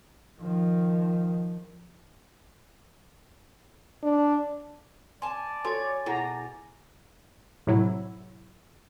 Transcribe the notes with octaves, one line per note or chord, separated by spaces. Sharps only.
D#3 F3
D4
D5 G#5 A5 C6
F#4 A4 C#5 G#5 C6 D6 A6
B2 E4 G#4 F#5 A#5
A2 C3 F#3 E4